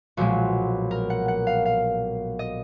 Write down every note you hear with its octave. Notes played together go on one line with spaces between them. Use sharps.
B1 A#2 F3 G#3 F#4
A#4
F#5
F#5
F5
F5
D#5